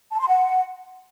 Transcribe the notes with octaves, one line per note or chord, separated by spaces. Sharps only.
A5
C6
F#5